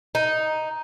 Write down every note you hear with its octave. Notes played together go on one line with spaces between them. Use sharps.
D#4